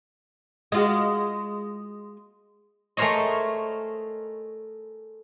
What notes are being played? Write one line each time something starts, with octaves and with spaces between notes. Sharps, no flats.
G#3 F4 F#4
A3 G#4 A#4 C5 C#5 D#5